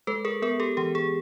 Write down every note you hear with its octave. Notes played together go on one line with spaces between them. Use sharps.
G#3 A4 B4
G#4 A#4
B3 G#4 A#4
G4 A4
E3 G4
G#4